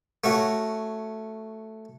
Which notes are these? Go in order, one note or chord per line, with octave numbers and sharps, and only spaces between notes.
A3 C#4 F#4